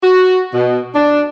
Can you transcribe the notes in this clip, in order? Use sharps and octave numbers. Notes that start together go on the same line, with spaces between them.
F#4
B2
D4